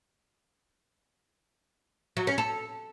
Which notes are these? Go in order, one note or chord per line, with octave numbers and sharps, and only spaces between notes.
F#3
C#4
A4